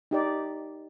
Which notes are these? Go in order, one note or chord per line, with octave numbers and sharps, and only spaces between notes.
D#4 G4 D5